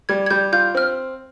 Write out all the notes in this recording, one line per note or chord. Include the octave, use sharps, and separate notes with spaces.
G3 G#6
G#6
G3 G6
F4 G6
C4 F6